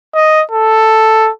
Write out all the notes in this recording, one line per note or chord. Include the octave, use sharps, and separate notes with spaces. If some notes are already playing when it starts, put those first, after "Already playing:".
D#5
A4